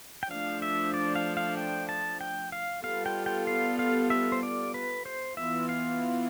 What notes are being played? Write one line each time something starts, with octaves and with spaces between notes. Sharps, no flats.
G5
F3 A3 D4 F5
E5
D5
F5
F5
G5
A5
G5
F5
G3 B3 F4 A4 F5
G5
G5
F5
F5
E5
C5
D5
B4
C5
E3 B3 F4 E5
F5